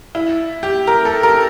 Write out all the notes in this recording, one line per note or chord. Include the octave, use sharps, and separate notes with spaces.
E4
G4
A#4
A4
A#4